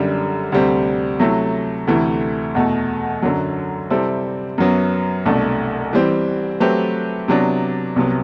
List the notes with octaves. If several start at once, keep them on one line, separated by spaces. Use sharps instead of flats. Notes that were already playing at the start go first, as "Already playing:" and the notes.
Already playing: F#2 D3 G3
D2 C3 G3 C4
C3 F#3 A3 E4
D2 C3 E3 A3
E2 B2 A3
F#2 D3 F#3
C3 G3 C4 E4 A4
F#2 F#3 B3
C2 B2 A3 D4
E3 G3 C4
F#3 A3 C4 G4 B4
C3 F#3 B3 D4
C2 C3 F#3 B3